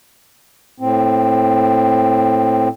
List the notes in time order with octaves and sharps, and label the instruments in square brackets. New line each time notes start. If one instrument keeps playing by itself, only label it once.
[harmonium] A2 C4